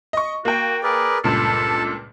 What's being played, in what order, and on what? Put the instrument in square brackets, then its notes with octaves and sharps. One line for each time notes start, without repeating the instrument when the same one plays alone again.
[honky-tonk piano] D#5 C#6
[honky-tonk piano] A#3 G5 [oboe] F#4
[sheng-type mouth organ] G#4 A#4 B4 [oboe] D5
[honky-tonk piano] C#2 G2 A#2 [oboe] A4 [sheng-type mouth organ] A5